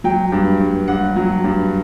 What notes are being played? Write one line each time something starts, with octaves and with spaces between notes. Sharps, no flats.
F#3 G5
G2
G2
G2 F#5
F#3
G2